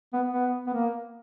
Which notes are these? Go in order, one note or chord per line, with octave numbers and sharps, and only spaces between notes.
B3
B3
B3
A#3